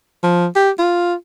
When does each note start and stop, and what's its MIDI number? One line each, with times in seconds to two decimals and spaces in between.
0.24 0.47 53
0.56 0.70 67
0.79 1.14 65